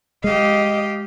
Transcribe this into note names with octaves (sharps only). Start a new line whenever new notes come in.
G#3 G4 D#5 F5